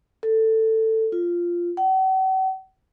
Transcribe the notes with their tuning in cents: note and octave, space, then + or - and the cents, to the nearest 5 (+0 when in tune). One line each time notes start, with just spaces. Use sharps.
A4 +15
F4 -5
F#5 +45